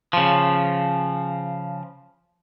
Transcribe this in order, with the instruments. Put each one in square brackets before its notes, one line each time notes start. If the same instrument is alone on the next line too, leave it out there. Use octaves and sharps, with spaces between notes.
[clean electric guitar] C#3 F3